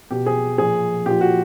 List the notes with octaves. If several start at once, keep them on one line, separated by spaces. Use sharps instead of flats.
B2 G4
G#4
A#2 F3 G#4
A#2 F3 G4
F#4